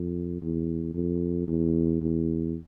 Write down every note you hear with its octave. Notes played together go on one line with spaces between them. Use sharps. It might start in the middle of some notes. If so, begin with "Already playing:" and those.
Already playing: F2
E2
F2
E2
E2